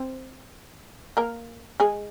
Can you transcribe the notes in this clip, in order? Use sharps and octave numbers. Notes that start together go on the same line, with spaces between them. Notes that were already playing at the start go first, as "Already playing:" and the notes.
Already playing: C4 C5
A#3 A#4
G#3 G#4